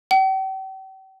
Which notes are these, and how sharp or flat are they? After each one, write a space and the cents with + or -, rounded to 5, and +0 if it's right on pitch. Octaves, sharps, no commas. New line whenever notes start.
G5 -40